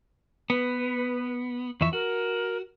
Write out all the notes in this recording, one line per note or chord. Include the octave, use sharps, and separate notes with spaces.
B3 B4
F2 E3 E5 C#6
F#4 A#4